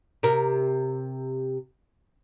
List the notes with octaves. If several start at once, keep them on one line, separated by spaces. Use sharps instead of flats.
C3 A#4